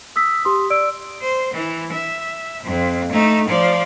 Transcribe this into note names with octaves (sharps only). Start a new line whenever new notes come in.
D#6 E6 B6
G4 C6 D#6
D5 E6 D7
C5
E3
E5
F2
A3 D#4
F3 D5